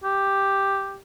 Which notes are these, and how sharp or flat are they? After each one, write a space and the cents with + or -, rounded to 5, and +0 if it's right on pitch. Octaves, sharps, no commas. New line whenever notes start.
G4 +0